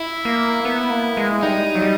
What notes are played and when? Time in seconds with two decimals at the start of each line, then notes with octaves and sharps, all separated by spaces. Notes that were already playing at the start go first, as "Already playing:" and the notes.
Already playing: E4
0.25 A#3
0.65 B3
0.90 A#3
1.17 G#3
1.43 G3 D#4
1.75 F#3
1.82 G3